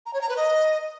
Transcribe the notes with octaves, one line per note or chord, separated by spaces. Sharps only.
A#5
C#5
A#5
B4
D#5